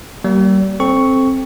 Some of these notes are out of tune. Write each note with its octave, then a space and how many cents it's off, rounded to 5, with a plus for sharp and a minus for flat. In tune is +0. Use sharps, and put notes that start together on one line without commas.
G3 -35 A#3 +0
C4 +10 A4 -10 C#6 +5